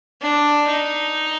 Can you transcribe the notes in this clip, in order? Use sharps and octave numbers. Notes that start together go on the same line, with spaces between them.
D4
D#4